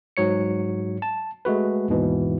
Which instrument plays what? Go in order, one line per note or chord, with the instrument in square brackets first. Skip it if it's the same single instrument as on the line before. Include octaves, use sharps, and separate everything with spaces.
[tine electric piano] G#2 F#3 C#5 C#7
A5
G#3 A3 F#4 B4
D#2 G#2 B2 E3